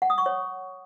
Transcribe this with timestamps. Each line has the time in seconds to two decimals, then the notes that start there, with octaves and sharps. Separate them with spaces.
0.02 F#5
0.10 D#6
0.18 C#6
0.26 C#5